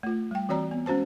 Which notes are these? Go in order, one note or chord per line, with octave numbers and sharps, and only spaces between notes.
A3 F4
G3 G5
E3 C4 F#4 C#5 D5 A#5
B3
G#3 C#4 F#4 C5 A5